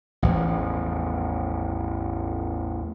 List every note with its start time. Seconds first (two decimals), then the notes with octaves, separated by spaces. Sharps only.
0.22 A1 E2 F3